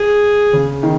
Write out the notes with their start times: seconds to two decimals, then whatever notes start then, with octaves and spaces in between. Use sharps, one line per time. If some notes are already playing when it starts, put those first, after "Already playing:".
Already playing: G#4
0.53 C#3
0.83 D#3